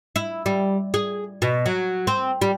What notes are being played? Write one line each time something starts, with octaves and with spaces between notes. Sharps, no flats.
E4
G3
G#4
B2
F#3
C4
G3